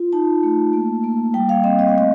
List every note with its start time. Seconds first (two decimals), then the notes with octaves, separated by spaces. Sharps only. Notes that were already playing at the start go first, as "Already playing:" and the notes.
Already playing: F4
0.13 D#4 A5
0.43 A3
0.73 A#3
1.04 A#3
1.34 G3 G5
1.49 F5
1.64 C4 D#5
1.79 D#5
1.88 F5
1.94 A3 D#5